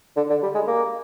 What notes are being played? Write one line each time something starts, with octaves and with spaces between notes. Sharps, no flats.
D3
D3
G3
G#3
A#3